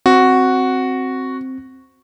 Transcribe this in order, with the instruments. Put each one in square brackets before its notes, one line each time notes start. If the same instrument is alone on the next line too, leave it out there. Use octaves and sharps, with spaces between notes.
[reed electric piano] C4 [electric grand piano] F#4